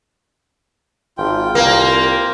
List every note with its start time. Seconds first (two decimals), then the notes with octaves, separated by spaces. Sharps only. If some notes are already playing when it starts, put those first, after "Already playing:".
1.18 G#1 F4 G5
1.55 C2 A#3